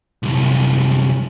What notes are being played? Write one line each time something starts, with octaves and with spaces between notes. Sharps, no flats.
C2 F#2